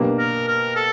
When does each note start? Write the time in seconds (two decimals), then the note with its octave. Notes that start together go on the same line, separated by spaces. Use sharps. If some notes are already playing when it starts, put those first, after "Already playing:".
Already playing: B2 F#3 A#3 D4 G4
0.18 A#4
0.47 A#4
0.75 A4